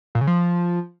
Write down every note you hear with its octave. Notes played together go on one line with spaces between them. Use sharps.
A#2
C#3
F3